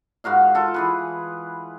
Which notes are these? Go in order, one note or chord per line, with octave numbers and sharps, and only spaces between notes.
G#2 F#4 A#4 F5
F4 A4
E3 G#4 B4